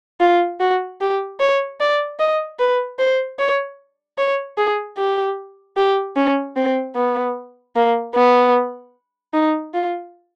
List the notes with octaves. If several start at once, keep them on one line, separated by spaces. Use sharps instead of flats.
F4
F#4
G4
C#5
D5
D#5
B4
C5
C#5
C#5
G#4
G4
G4
C#4
C4
B3
A#3
B3
D#4
F4